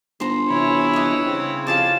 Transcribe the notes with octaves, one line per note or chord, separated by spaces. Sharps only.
G1 C5 A#5
C3 E3 E4 C#5 B5
B4 D#5
C#3 C4
F2 G4 G#4 F5 A5